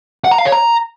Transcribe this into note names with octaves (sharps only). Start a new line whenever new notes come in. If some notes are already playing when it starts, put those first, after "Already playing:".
F#5
A#5
F5
C#5
A#5